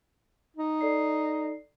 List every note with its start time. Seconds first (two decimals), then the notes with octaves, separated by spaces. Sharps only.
0.57 D#4
0.81 A4 D5 C7